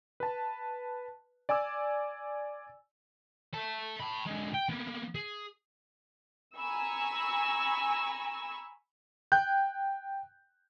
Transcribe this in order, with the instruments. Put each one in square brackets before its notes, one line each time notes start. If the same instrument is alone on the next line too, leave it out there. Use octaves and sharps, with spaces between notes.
[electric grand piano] B4 A5
D5 G#5 D6 E6
[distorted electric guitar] E5 A5
A5 B5
D3 G#3
G5
A#3 B3
G#4
[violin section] G#5 A#5 B5 C#6 E6
[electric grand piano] G5 F#6 G6